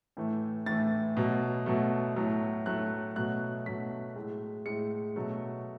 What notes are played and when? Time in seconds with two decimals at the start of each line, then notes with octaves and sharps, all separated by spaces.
0.17 A2 E3 A3
0.66 A2 E3 A3 A6
1.17 B2 F#3 A3
1.66 B2 F#3 A3
2.16 A2 F#3 A3
2.66 A2 F#3 A3 F#6
3.16 B2 F#3 A3 F#6
3.66 B2 F#3 A3 B6
4.16 A2 G#3
4.66 A2 G#3 C#7
5.16 B2 F#3 A3